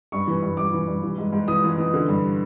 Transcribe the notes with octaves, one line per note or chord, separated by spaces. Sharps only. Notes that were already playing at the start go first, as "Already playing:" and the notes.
G2 C#6
E3
G2
G2 D6
E3
G2
E3
G#2
G#2
E3 D#6
E3
E3
D3
G2